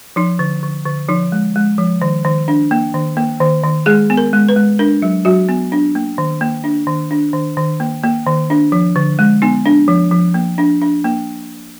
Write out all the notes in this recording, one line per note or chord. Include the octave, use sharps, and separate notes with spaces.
F3 D#4
D3
D3
D3
F3 D#4
G#3
G#3
F3
D#3
D#3
D4
A#3
D#3
A#3
D#3
D#3
G#3 G#4
B3
A#4
G#3
B4
G#3
D4 A#4
F#3
F#3 F#4
B3
D4
A#3
D#3
A#3
D4
D#3
D4
D#3
D#3
A#3
A#3
D#3
D4
F3
D3
G#3
B3 D#4
D4
F3
F3
A#3
D4
D4
A#3